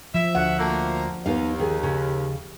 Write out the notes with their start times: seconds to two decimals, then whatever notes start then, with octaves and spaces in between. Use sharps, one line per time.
0.15 F3 E5
0.35 D2 F#5
0.58 F3 A3 A#3
1.26 D#2 B3 D#4 F5
1.59 D#3 G#4
1.83 C#3